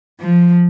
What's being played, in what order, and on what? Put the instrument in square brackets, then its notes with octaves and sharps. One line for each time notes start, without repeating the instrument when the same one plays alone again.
[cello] F3